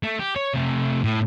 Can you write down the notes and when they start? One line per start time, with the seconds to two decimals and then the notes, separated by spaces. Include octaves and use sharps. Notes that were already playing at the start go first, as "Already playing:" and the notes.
0.03 A3
0.19 G4
0.36 C#5
0.54 C3 A3
1.04 A2